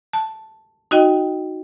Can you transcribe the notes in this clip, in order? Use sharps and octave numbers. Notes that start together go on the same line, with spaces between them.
A5
D#4 F#4 D#5 G5